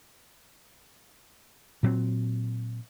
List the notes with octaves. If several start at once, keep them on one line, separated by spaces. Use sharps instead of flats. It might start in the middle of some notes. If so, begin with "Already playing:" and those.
A#2 F#3 C4